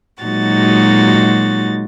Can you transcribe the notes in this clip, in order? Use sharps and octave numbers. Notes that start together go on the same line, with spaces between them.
A#2 F#3 G#3 D#4 F#4 A6